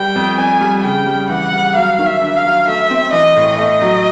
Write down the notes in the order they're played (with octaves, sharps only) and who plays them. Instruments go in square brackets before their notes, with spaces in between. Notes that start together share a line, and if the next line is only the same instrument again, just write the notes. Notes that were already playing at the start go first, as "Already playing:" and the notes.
Already playing: [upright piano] G3 [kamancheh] G5
[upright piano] F2
[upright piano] F2 [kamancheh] G#5
[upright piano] G3
[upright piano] C#3 [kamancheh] G5
[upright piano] G3
[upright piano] E3 [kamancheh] F#5
[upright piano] G3
[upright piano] F#3 [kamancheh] F5
[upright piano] D#3
[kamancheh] E5
[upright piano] D4
[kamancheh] F5
[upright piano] F#3
[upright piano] A3 [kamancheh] E5
[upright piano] C4
[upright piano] E3 [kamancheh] D#5
[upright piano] A2
[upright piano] A3 [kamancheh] D#5
[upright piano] F#3